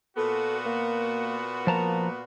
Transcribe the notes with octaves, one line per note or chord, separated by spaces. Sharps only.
A#2 B3 F#4 A4
A#3
F3 A#3 A5 A#5